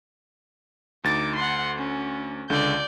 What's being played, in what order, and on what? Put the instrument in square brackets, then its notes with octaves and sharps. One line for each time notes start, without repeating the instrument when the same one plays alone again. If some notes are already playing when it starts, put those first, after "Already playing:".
[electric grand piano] D2 A6 [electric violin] D#4 D6
[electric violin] F#5 C6
C#4
[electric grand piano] C#2 D3 [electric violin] D5 G6